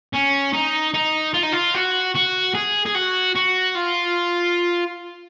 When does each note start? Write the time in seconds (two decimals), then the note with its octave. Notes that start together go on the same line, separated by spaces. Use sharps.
0.13 C#4
0.53 D#4
0.94 D#4
1.34 F4
1.43 D#4
1.53 F4
1.75 F#4
2.15 F#4
2.55 G#4
2.86 G#4
2.95 F#4
3.35 F#4
3.75 F4